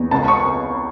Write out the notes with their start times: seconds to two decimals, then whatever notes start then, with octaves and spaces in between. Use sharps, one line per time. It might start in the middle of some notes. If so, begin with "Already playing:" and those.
Already playing: E2
0.11 C#2 A5
0.28 C#6